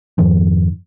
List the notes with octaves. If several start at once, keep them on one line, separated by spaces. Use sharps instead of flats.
F2 G#2 D#3 F3